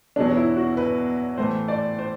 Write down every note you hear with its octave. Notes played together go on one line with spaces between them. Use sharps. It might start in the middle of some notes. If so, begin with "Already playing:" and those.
E2 B2 F#3 D4
E4
F#4
B4
A2 E3 A3 C5
D5
C5